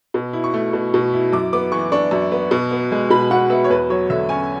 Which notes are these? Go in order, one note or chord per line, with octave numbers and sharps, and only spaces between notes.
B2
E4
C#6
A3
B2
B2
E4
F#2 D6
B3 D6
E3 C#6
D4 C#6
F#2
B3
B2
B3
G#3
B2 B5
B2 F#5
B3 E5
C#5
E2 B4
F#3 C#5
D3 E5
C#4 G#5